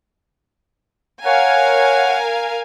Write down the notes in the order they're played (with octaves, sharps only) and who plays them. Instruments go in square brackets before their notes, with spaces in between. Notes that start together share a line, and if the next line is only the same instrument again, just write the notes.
[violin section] A#4 F5 G#5 [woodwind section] C#5 F#5